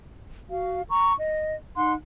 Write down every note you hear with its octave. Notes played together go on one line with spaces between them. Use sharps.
F#4 F5
A#5 C#6
D#5
D#4 F#5 C6 F#6